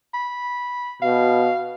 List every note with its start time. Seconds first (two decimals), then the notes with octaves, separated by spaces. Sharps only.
0.14 B5
1.02 B2 F5